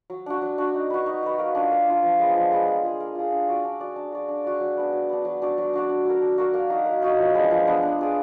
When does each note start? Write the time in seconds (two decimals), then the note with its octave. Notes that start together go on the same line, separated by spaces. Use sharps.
0.10 F#3
0.26 D4 F#4
0.42 F#3
0.58 D4 F#4
0.74 D#4
0.90 F#4 B4
1.06 D#4
1.23 F#4 B4
1.39 A#3
1.55 D4 F4
1.71 A#3
1.87 D4 F4
2.02 F3
2.19 G#3 B3
2.36 F3
2.51 G#3 B3
2.68 A#3
2.84 F4 G#4
3.00 A#3
3.15 F4 G#4
3.32 D4
3.48 F#4 D5
3.65 D4
3.80 F#4 D5
3.96 D4
4.12 F#4 D5
4.28 D4
4.45 F#4 D5
4.60 F#3
4.77 B3 D4
4.93 F#3
5.09 B3 D4
5.25 F#3
5.42 D4 F#4 D5
5.58 F#3
5.73 D4 F#4 D5
5.89 D4
6.06 F#4 A#4
6.21 D4
6.38 F#4 A#4
6.54 A#3
6.70 D#4 F#4
6.86 A#3
7.02 D#4 F#4
7.18 F3
7.34 G#3 B3 D4
7.51 F3
7.67 G#3 B3 D4
7.83 D4
7.99 F4 G#4 D5